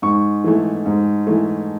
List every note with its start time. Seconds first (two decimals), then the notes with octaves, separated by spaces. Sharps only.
0.02 G#2 C#6
0.44 E3 A3
0.86 G#2
1.27 E3 A3